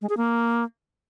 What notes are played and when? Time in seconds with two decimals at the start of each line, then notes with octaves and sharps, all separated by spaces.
0.02 G#3
0.09 G#4
0.17 A#3